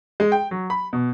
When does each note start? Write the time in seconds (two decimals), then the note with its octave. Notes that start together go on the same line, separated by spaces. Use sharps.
0.20 G#3
0.32 G5
0.51 F#3
0.70 B5
0.93 B2